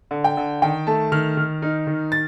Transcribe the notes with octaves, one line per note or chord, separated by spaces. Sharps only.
D3
G5
D3
D#3 G5
A3 A5
D#3 F6
D#3
D#4
D#3
A6